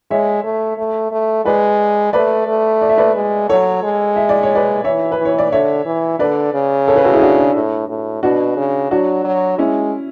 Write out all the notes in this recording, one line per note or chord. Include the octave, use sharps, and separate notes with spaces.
G#3 C#5 E5
A3
A3
A3
G#3 B4 D5
A3 B4 D5
A3
D5
E5
B4 D5
G#3
F#3 A4 C#5
G#3
E5
D5
C#5
B4 D5
E3 C#5 E5
B4
E3
C#5
D5
D3 C#5 E5
E3
D3 B4 D5
C#3
A4 C#5
G#4 B4
F#4 A4
E4 G#4
D4 F#4
D4
A2
A2
B2 D4 F#4
C#3
F#3 D4 F#4
F#3
G#3 C#4 E4